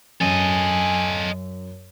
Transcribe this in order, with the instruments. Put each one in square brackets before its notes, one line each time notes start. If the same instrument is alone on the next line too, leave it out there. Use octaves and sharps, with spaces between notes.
[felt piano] F#2 [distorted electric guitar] A4 D#5 [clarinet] G#5